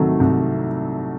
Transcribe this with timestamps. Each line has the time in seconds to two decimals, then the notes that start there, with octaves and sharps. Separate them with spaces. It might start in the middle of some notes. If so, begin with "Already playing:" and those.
Already playing: C2 C3 D#3 F#3 A3
0.20 C2